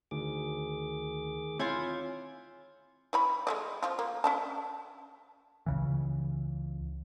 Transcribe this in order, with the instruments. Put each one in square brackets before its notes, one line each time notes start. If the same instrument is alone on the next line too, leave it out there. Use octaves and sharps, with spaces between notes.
[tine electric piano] D2 [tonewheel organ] D#3 G#4 D6
[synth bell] C4 C#5 G#5 [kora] E4 F4
[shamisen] E3 C#5 B5
G#3 A3 D5
F3 F4
A#3
C#4 D4 A5
[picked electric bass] C#2 C#3 E3